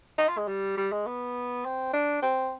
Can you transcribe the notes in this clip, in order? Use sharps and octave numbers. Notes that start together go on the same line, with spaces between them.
D#4
F4
G#3
G3
G3
G#3
B3
C4
D4
C4